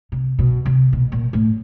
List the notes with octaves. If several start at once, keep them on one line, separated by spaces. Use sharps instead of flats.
C3
B2
C3
B2
A#2
A2